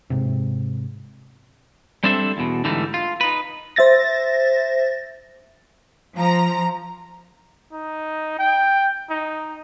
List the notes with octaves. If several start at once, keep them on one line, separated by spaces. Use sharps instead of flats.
G#2 C3
G3 C4 D4 A4 C5 E5
E2 B2
G#2 D3 E3 G3 A3 D#4
F4
D#4 B4
C5 E5 A6 A#6
F3 A#5
D#4
G5
D#4